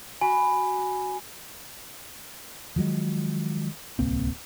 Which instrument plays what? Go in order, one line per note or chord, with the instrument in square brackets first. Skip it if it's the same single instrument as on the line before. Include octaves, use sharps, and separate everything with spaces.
[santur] F#4 B5 [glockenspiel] G#5
[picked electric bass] D#3 F3 F#3 G#3
D1 C2 A#3 C4